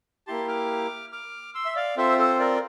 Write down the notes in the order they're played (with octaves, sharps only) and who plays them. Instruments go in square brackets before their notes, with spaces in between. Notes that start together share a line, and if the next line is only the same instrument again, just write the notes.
[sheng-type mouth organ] A#3 E4 G4 A5 C6
D6 F6
D6 F6
C6 E6
E5
D5 F5
C4 F4 A4 C5 E5
A4 C5
A#4 D5